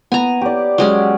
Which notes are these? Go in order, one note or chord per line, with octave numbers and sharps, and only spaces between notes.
B3 G#5 A#5
G4 D5
F#3 G#3 C#4